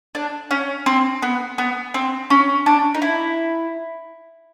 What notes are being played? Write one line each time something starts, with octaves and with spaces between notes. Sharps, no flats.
D4
C#4
C4
B3
B3
C4
C#4
D4
D#4
E4